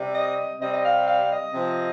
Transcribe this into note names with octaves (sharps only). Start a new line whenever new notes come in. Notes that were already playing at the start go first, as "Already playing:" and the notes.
Already playing: C3 G3 C4
D#5
C3 G3 C4 D#5
D#5
F5
F5
D#5
C3 F3 C4